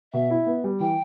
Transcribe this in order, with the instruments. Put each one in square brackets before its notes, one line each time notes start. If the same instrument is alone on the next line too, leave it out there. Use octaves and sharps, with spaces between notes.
[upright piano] B2 [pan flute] E5
[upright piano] E4
B3
G3
[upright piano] E3 [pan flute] G5